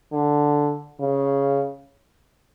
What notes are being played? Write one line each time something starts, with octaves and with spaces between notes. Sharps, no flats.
D3
C#3